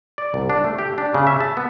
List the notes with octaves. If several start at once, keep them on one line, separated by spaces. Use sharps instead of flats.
D5
C2
D4
A3
G4
D4
C#3
E5
A5
B3